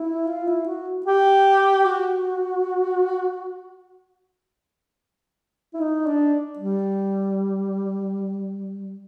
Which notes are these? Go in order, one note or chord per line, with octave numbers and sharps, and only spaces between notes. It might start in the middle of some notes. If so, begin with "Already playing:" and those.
Already playing: E4
F4
E4
F#4
G4
F#4
E4
D#4
D4
G3